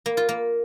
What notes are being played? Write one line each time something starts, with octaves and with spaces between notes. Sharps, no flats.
A#3
F4
A#3